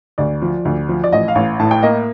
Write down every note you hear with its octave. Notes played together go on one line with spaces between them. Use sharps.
D2 D5
F3
D2
F3
D5
A1 D#5
F5
A1
A2 A5
G5
A#3 D#5